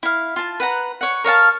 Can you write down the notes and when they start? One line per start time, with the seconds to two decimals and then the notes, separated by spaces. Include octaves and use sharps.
0.03 E4 F5
0.36 F4 A5
0.60 B4 F#5 A#5
1.01 C#5 F#5
1.24 A#4 C#5 F5 A5